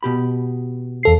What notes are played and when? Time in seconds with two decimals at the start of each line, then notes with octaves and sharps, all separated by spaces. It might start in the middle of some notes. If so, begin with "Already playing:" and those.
0.03 B2 G4 B5
1.03 E2 A4 C7